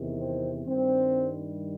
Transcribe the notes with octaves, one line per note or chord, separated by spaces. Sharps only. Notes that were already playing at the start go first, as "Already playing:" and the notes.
Already playing: E2 C3 D#3
C4
G2 D#3 G3 C4